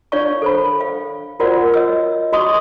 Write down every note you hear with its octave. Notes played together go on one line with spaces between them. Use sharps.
D4 C#5 D5 F5 C#6
A4 C5 B5
F5
F4 F#4 A#4 C5 D5 F#5
C#5 D#5 E6
F#4 D#5 C6 C#6 D#6